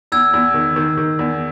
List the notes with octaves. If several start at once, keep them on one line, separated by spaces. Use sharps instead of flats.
E2 E6 G#6
E2
D#3
D#3
D#3
E2